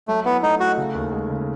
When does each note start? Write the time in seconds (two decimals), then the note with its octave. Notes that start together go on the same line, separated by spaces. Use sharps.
0.08 F#3 A3
0.25 B3 E4
0.43 A3 D#4
0.60 A3 F#4
0.77 C#3
0.95 D#2
1.13 G#3
1.30 C#3